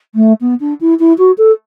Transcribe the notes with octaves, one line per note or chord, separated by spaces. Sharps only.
A3
B3
D4
E4
E4
F#4
A4